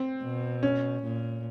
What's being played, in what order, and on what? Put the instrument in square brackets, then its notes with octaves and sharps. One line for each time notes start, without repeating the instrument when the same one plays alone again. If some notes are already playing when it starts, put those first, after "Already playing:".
Already playing: [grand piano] C4
[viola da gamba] B2
[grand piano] C#4
[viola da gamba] A#2